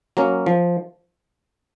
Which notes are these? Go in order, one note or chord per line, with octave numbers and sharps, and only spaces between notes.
F#3 A#3 C#4
F3